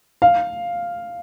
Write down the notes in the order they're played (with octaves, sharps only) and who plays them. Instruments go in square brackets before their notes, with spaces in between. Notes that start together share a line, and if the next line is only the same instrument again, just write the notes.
[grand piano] F5